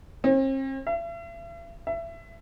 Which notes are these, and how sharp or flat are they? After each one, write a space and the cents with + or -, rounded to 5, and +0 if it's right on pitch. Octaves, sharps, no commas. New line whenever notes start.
C4 +45
E5 +45
E5 +25